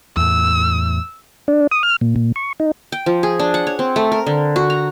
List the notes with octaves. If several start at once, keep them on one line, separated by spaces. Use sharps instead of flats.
E2 A2 E6
D4
D#6
F6
A#2
A#2
C#6
D#4
G5
F3
G#4
D4
F#5
C#5
C4
A3
A#4
D3
F#4
A#5